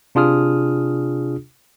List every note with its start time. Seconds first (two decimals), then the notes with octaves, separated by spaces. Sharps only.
0.15 C3 D4 F4 G#4 D#6 F6